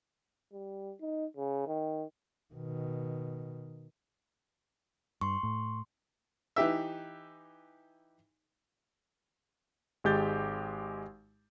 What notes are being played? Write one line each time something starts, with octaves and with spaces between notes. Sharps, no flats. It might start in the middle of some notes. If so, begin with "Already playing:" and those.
G3
D#4
C#3
D#3
B2 D#3
G2 C6 C#6
A2
E3 D#4 G4 E5
G#1 G#3 G4 G6 A6